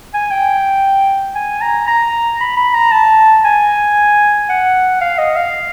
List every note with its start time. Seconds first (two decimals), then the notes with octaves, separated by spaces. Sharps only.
0.14 G#5
0.31 G5
1.35 G#5
1.62 A#5
1.88 A#5
2.40 B5
2.57 B5
2.74 A#5
2.92 A5
3.44 G#5
4.49 F#5
5.01 F5
5.18 D#5
5.36 F5